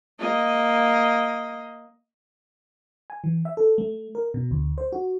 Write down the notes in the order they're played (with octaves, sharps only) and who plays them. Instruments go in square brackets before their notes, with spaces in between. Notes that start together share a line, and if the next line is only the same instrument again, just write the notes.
[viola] A#3 D#5
[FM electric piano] G#5
E3
E5
A4
A3
A#4
B2
D2
C5
F#4